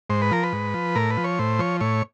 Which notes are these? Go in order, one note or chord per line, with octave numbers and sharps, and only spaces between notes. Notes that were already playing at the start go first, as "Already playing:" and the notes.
G#2 C5
B4
F3 A#4
B4
G#2
F3
A2 A#4
B4
F3
C#5
A2 C5
F3 C#5
A2 C#5